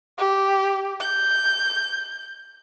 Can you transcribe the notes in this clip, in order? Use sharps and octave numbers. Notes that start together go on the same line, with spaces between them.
G4
G6